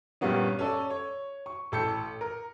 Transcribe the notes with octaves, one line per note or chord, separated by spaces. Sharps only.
G2 A#2 G3 A#3 B3 C#4
C#4 A4 D5
C#5
C#6
A1 A4 G6 C#7
A#4